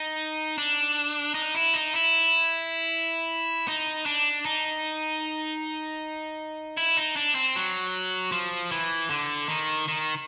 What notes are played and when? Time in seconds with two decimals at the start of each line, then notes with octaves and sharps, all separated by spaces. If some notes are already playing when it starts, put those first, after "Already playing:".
Already playing: D#4
0.58 D4
1.34 D#4
1.55 E4
1.74 D#4
1.93 E4
3.68 D#4
4.06 D4
4.45 D#4
6.77 E4
6.97 D#4
7.16 D4
7.35 C4
7.56 F#3
8.32 F3
8.71 E3
9.10 D3
9.49 D#3
9.88 D#3